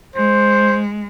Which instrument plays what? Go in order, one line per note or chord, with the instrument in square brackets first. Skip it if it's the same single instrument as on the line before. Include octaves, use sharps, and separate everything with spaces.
[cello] G#3 [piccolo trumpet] C5